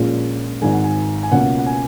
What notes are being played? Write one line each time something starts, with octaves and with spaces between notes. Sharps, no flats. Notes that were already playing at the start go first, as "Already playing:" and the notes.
Already playing: A#1 A#2 G#3 C#4
G#1 G#2 D#3 G#3 G#5
F#5
G#5
G#5
C#2 B2 A#3 C#4 F#5
F#5
G#5